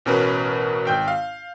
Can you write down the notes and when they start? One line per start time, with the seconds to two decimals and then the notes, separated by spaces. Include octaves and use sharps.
0.06 A1 B2 C#4 A#4 B4
0.85 G#1 G5 G6
1.08 F5